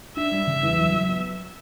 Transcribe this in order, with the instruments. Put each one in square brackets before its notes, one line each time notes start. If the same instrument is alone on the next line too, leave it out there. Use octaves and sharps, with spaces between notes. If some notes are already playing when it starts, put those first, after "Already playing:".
[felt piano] D4 [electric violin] E5
[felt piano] G3
C#3
E2
F#3
F#3
B3